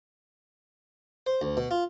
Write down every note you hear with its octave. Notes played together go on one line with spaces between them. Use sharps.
C5
D2
B2
F4